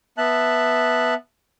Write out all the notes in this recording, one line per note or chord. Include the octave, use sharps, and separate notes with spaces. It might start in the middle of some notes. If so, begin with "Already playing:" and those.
B3 E5 A5 F#6